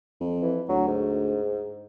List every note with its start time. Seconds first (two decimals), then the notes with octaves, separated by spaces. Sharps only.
0.21 F2
0.42 E3
0.69 D2 F#3
0.87 G#2